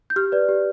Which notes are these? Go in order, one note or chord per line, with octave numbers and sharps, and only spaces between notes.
G6
G4 F6
B4 D5
G4